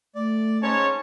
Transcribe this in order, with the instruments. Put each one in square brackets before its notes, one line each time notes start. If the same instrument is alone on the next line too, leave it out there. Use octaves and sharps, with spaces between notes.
[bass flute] A3 [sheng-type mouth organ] D5
[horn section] G#2 C#5 [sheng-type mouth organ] C#4 A5